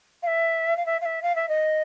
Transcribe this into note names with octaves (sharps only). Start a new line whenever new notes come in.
F5
E5
F5
E5
F5
E5
F5
E5
D#5